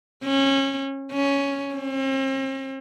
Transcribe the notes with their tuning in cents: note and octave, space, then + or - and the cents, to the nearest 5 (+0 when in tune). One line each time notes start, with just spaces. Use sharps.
C#4 -25
C#4 +5
C4 +45